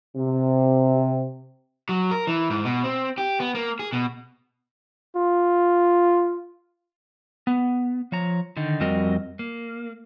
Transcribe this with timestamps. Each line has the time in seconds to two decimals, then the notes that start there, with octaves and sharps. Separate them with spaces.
0.17 C3
1.89 F#3
2.11 A#4
2.27 E3
2.50 G#2
2.65 B2
2.84 C4
3.18 G4
3.40 B3
3.55 A#3
3.79 G#4
3.93 B2
5.17 F4
7.47 B3
8.12 F3 C#5 A#5
8.57 D3 D#3 D#4
8.80 F2 G3 C4 F#4 A#4 D#5
9.39 A#3